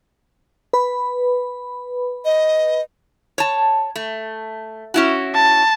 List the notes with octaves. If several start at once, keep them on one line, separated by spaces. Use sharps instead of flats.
B4 B5
D#5
C#5 A5
A3
C#4 E4 F#4
A5